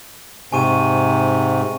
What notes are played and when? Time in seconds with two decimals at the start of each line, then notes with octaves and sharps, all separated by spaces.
0.52 G#2 C3 G#5 C#6 D#7